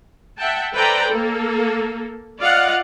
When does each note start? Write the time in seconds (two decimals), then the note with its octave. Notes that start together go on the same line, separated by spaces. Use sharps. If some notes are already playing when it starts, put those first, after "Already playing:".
0.37 E5 F#5 G5 A5
0.73 A4 B4 C5 D5 G5 A#5
1.09 A#3 A4
2.40 F4 D5 D#5 F5 F#5